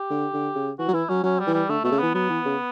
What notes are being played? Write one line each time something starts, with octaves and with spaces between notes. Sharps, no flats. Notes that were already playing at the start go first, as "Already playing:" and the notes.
Already playing: G4
D3
D3
C#3
E3 F#4
F#3
E3 E4
F#3 C#4
F#3 C#4
G3
E3
G3
D3 A3
B2 A3
C#3
E3 B3
F#3 B3
E3
C#3